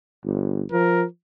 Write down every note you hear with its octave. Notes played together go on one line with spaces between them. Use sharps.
G1
F3 A#4